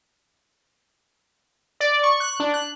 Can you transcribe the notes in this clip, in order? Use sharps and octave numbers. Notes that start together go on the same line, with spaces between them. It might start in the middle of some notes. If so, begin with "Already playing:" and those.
D5
C#6
F#6
D4
F#6